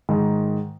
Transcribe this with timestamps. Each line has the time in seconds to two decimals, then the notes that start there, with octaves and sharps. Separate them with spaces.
0.09 G#2 D#3 G#3